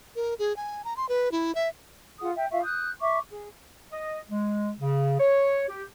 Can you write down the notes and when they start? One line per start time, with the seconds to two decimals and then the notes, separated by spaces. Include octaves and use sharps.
0.16 A#4
0.39 G#4
0.56 G#5
0.84 A#5
0.97 C6
1.09 B4
1.32 E4
1.55 E5
2.20 F4 G#4 F#5 D#6
2.36 E5 G5
2.51 F4 E5 F5 C#6
2.63 D#6 F#6 G6
3.01 E5 C#6 D6
3.29 G#4
3.92 D#5
4.29 G#3
4.80 C#3
5.20 C#5
5.69 G4